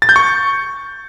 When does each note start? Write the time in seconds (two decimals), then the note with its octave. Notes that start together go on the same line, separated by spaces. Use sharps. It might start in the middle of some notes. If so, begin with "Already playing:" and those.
0.02 A6
0.09 G6
0.16 C#6